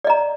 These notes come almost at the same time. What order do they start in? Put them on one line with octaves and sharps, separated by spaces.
D5 D#5 A#5